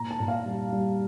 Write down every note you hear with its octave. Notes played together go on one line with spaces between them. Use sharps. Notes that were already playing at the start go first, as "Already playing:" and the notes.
Already playing: A#2 A#5
A5
A#2
F5
G3
G3